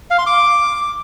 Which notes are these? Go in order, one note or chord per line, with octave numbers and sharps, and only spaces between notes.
F5
C6
D6